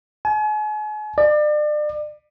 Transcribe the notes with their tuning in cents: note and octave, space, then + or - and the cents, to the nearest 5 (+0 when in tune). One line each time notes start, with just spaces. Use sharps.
G#5 +40
D5 +35